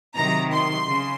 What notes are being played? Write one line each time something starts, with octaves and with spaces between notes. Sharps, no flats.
C3 D#3 F#3 A#5
C6
C#3